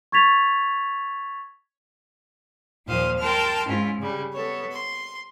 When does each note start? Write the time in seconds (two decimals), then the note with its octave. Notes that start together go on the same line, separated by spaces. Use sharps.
0.12 C#6 G#6 A6 B6 F7
2.87 D#2 A#2 F3 C5 F5 D#6
3.19 A#4 G5 A5 C6 F6
3.66 G#2 C#4 E4 F4
4.00 C#3 G3
4.33 B3 A4 C#5
4.72 C6